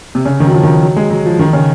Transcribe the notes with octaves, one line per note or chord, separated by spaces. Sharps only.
C3
C#3
D#3
F#3
F3
D#3
F#3
G#3
F#3
F3
D#3
C#3